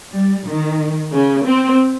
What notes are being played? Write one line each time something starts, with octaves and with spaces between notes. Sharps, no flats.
G3
D#3
C#3
C4